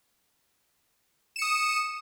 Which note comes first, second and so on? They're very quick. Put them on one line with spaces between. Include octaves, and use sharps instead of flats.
E7 C#7 D#6